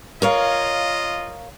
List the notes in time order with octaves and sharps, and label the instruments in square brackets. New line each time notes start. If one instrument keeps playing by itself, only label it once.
[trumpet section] F4 D#5 [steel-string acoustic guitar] A#4 C#5 F5